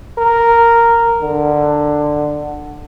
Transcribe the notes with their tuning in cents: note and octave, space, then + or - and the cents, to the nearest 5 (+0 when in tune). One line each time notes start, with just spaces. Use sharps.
A#4 -5
D3 +15